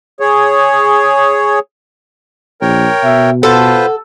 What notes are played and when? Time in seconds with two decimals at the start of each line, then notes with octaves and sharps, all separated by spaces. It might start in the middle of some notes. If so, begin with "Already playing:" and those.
0.20 G#4 C#5
2.61 A#1 A#4 C#5 G5
3.04 B2 E5
3.43 F4 A4 B4 C5 F#5